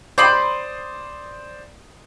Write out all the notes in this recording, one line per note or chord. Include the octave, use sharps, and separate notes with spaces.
C5 D5 G5 B5 C6 D6 D#6 G6